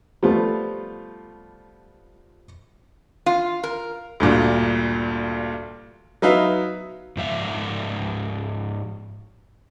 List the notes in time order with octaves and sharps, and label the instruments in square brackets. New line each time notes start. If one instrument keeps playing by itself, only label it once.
[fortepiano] F3 G3 A3 B3 F4
[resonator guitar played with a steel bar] F4
A#4
[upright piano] D2 G2 A#2
F#3 B3 D#4 B4 E5 F5
[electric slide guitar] G#2 F3 E5 F5